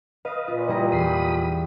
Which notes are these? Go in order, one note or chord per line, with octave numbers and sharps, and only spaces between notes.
B4 D#5 F5
A#2 F4
G3 E4 A#5
E2 B5 D#6 C7